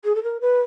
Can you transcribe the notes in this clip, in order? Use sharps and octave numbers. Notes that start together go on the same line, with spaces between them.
G#4
A4
A#4
B4